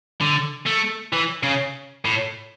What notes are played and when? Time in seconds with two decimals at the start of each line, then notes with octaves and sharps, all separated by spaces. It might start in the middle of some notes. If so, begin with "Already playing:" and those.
0.21 D3
0.66 A3
1.13 E3
1.43 C#3
2.05 A2